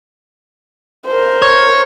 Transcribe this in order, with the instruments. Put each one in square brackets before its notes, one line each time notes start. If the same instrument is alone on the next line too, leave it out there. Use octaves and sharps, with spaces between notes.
[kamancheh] A#4 C5
[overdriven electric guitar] C#5